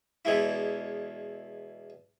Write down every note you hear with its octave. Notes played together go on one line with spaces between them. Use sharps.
E2 B2 G#3 E4